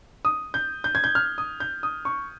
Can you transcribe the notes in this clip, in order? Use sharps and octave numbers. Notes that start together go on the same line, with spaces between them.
D#6
G6
G6
G#6
G6
F6
D#6
G6
D#6
C#6